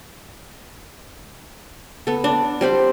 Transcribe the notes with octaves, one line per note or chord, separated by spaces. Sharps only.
B3 A4
D4
G3 C4 C5 B5